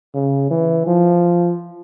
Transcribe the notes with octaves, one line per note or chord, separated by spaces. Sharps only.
C#3
E3
F3